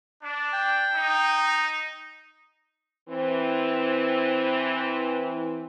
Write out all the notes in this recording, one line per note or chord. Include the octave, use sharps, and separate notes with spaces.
D4
G5
D#4
E3 C4